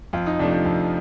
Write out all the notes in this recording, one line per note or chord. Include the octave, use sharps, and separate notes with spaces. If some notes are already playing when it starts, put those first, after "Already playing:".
F2 F4
D#4
C3 F3 A3 D4
D4
F2